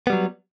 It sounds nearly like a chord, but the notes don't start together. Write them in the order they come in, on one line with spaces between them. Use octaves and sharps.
B3 G3 F#3